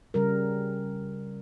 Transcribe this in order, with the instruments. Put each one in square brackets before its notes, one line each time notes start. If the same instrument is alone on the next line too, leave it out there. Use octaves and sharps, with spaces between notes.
[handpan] C#3 G3 A#4